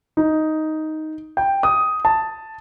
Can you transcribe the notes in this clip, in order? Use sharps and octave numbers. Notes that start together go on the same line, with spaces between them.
D#4
G5
D#6
A5